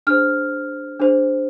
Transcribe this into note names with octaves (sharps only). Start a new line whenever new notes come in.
D4 G#4 C5 F6
D4 G#4 C5